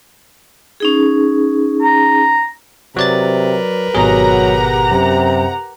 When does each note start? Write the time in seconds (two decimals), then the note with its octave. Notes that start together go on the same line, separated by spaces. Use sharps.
0.80 C#4 D#4 G#4
1.82 A#5
2.96 C3 F#3 A#4 B4 D5 A6
3.95 G#1 B2 F#3 G4 G#4 F#5 A#5
4.91 F#2 C3